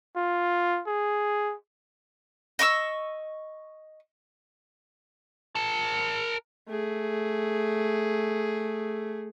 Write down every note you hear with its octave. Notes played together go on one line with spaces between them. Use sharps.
F4
G#4
D#5 C#6 D6 E6
A#4 A5
A3 G#4